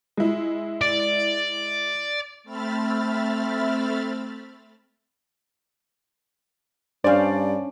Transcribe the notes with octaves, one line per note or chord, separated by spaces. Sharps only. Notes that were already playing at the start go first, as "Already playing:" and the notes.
G#3 E4
D5
A3 C4 E5 B5 F6 A6
G2 C#4 D4 C5 D5 F5